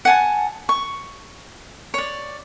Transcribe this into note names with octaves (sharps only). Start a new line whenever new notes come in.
F#5 G#5 A5
C#6
C#5 D5